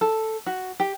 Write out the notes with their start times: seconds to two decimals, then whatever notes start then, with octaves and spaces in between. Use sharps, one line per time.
0.01 A4
0.46 F#4
0.80 G4